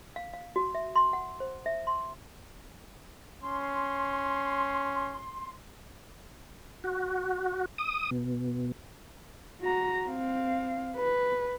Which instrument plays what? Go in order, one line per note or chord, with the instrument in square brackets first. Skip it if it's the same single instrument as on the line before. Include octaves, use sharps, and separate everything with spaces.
[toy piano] F5
F5
F#4
E5
C6
F#5
C5
E5
C6
[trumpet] C#4 [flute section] C6
[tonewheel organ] F#4
D#6
B2
[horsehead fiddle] F#4 A#5
C4 F5
B4